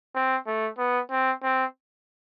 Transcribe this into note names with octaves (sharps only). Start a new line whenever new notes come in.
C4
A3
B3
C4
C4